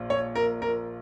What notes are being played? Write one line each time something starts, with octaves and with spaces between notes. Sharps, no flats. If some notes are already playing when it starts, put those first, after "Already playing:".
Already playing: A#1 F4
C#5
A#4
A#4